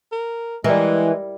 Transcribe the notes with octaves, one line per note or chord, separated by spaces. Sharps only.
A#4
E3 G3 G#3 A#4